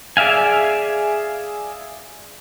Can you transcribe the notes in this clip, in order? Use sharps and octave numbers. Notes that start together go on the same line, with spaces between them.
G#4 D5 E5 F5 G#5